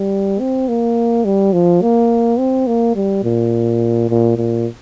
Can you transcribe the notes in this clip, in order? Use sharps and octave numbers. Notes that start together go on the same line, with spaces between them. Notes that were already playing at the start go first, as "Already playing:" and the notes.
Already playing: G3
C4
A#3
G3
F3
A#3
C4
A#3
G3
A#2
A#2
A#2